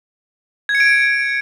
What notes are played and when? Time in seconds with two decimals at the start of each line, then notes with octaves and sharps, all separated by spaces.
0.69 G#6
0.75 C#7
0.80 D7